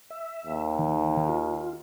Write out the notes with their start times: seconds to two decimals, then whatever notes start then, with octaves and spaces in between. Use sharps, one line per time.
0.10 E5
0.46 D#2
0.79 D#3
1.29 F4